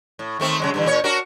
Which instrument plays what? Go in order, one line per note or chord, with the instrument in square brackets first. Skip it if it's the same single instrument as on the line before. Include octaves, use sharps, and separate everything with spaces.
[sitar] A2
D#3 A3 C4
C#3 F#3 G#3
G2 D3 E3
A#2 C#5
D4 F#4 A#4